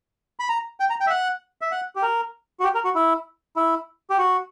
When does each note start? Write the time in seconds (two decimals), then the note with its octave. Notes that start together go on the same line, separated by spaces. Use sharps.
0.39 B5
0.49 A#5
0.80 G5
0.90 A#5
1.00 G5
1.07 E5
1.10 F#5
1.61 E5
1.72 F#5
1.96 G4
2.03 A#4
2.60 F#4
2.64 G4
2.75 A#4
2.85 F#4
2.95 E4
3.56 E4
4.10 G4
4.18 F#4